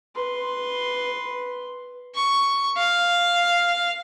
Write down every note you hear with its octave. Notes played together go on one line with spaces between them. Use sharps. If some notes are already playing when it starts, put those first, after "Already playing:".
B4 C6
C#6
F5